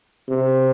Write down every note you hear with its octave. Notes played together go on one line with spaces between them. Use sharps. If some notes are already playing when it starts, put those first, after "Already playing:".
C3